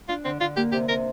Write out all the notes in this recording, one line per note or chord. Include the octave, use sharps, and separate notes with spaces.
D4 F4
D3 C4
D3 F4
A#3 G4
C3 G4
C3 A#4